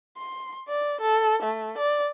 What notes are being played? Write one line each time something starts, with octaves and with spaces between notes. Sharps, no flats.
C6
D5
A4
A3
D5